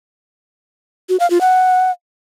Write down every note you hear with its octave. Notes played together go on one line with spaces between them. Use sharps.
F#4
F5
F4
F#5